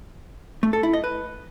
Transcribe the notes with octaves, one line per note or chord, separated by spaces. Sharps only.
A3
A4
E4
D#5
B4